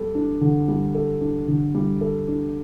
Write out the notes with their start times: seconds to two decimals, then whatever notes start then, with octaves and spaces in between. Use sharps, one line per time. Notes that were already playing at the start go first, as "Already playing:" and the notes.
Already playing: G3 A4
0.15 D4
0.41 D3
0.68 G3
0.95 A4
1.21 D4
1.48 D3
1.75 G3
2.01 A4
2.28 D4